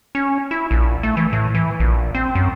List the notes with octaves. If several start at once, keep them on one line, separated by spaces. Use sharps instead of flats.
C#4
E4
A#1
A3
E3
A2
E3
A#1
C4
F#2